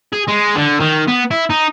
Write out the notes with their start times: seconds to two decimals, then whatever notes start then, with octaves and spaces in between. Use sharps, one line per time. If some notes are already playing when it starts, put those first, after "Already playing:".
0.13 G#4
0.28 G#3
0.57 D3
0.80 D#3
1.08 B3
1.31 E4
1.50 D#4